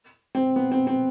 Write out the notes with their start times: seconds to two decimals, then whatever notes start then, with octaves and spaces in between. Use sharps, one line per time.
0.35 C4
0.56 B3
0.72 C4
0.87 C4